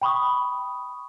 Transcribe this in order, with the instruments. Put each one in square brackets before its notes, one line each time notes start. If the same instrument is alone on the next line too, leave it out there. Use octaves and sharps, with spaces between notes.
[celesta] G5 B5 C#6 D#6